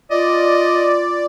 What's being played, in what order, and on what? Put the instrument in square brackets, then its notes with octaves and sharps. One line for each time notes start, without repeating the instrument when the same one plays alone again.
[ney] F4 [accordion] D5 [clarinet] D#5